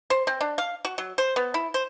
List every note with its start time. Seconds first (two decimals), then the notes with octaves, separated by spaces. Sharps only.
0.10 C5
0.27 C4
0.41 D4
0.58 F5
0.85 F#4
0.98 F#3
1.18 C5
1.36 B3
1.54 E4
1.74 C5